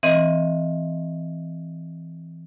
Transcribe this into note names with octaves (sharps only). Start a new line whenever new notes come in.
E3 C4 D#5